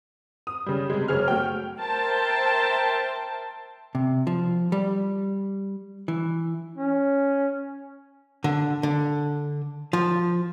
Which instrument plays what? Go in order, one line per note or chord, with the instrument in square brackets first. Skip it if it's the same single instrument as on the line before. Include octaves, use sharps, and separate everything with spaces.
[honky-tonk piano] D#6
C#3 G3
C3 G3 G#3
F#1 G#4 C#5 F6
A3 F#4 G5
[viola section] A#4 C5 E5 G5 A5 C6
[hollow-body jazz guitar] C3
F3
G3
E3
[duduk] C#4
[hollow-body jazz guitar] D3
D3
F3